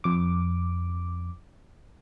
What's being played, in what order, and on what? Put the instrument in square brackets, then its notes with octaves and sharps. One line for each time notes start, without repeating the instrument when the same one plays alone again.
[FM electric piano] F2 D6